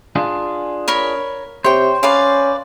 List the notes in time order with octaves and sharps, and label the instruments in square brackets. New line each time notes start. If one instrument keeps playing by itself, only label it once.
[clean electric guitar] D4 F4 G#4
[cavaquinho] A#4 C#5 B5
[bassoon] C3 [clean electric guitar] C5 [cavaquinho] C#5 G5
[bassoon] C#4 [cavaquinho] B4 D5 F5